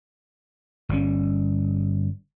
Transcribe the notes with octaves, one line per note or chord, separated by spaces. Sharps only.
G1 G3 C#4